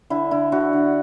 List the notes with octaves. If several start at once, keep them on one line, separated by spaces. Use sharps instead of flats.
D3 E4
D3 E4
D3 F#4
D3